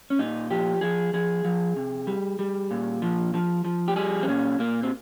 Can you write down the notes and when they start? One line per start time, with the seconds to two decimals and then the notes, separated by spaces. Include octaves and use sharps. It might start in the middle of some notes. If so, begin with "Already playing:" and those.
0.10 C#4
0.19 A#2 D#4
0.51 F3 G4
0.81 F3 G#4
1.13 F3 G#4
1.45 F3
1.76 C3
2.07 G3
2.39 G3
2.71 A#2
3.02 F3
3.34 F3
3.65 F3
3.88 G4
3.96 G3 G#4
4.23 C4
4.28 A#2 C#4
4.59 A#2 A#3
4.83 C4